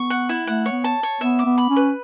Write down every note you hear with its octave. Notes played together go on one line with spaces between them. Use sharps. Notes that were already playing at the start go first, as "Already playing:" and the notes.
Already playing: B3 C#6
F#5
E4
A3 F#5
C#5
B3
A5
C#5
B3 E5
D6
B3
B5
C#4
B4